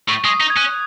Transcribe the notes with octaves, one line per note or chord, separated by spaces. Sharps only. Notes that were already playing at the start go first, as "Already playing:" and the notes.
A2 C#6
G#3 D#6
D#4
G#6
C#4 F#6